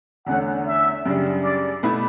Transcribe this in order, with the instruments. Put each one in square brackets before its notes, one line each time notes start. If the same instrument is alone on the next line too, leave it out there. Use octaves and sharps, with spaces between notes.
[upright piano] E2 D3 A3 C#4 [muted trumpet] F#5
[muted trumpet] E5
[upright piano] F#2 C#3 G3 D4
[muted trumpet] D5
[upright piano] B2 A3 E4 B4